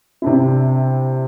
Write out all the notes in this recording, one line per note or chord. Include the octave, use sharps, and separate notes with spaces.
C3 D4 E4